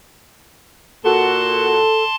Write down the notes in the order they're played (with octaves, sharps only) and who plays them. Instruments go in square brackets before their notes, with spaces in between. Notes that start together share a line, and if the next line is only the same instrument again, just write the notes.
[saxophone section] A#2 F#4 [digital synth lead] A4 [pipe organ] A5 C6